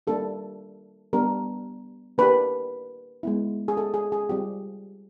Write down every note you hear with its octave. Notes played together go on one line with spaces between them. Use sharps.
G3 A#3 D4 G4 A4
G3 B3 D4 G4 A#4
A#3 D4 G4 B4
G#3 B3 E4
G#4
A4
G#4
G#4
G3 C4 F4 G4